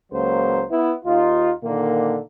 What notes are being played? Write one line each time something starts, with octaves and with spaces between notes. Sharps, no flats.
C#2 F#3 A#3 C5
B3 E4
D#2 D#4 F4
A#2 D3 D#3 A#3